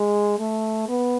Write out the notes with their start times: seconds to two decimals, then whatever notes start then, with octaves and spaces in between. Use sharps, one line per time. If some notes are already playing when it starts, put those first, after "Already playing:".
Already playing: G#3
0.39 A3
0.88 B3